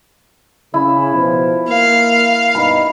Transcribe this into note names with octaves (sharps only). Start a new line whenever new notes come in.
C#3 E4
B2 F3
A#3 F5
G2 B2 D#4 B5